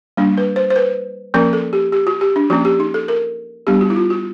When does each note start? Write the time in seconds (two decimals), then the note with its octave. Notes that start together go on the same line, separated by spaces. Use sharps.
0.17 G3 A#3 D4
0.38 B4
0.56 C5
0.70 C5
0.76 B4
1.34 F3 A#3 C#4 A#4
1.53 A4
1.73 G4
1.92 G4
2.07 F#4
2.21 G4
2.36 D4
2.50 F3 A#3 C#4 F#4
2.65 G4
2.80 D#4
2.94 A4
3.08 A#4
3.67 G3 B3 D4 G4
3.81 F#4
3.90 E4
3.96 F4
4.10 F#4